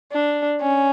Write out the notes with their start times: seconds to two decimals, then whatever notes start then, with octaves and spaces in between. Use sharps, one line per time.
0.13 D4
0.62 C#4